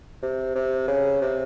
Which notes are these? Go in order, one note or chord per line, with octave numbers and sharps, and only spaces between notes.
C3
C3
C#3
C3